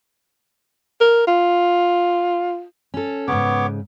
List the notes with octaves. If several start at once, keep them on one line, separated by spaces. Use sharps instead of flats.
A#4
F4
C#4 A4
G#2 C#3 B3 C#5 D6